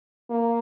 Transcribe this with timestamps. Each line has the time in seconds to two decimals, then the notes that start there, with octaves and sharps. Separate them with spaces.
0.30 A#3